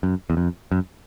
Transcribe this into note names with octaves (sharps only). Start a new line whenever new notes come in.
F#2
E2
F2
F#2